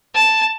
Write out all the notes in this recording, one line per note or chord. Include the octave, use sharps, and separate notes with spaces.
A5